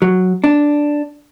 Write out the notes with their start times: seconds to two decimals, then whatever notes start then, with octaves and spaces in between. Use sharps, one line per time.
0.02 F#3
0.44 D4